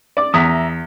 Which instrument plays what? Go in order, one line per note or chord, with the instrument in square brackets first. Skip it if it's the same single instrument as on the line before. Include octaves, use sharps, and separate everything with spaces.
[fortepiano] D5 D6
[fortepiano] E2 [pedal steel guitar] E5 A#5 D#6